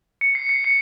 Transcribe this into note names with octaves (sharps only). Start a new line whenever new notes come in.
C#7
C7
C7
C#7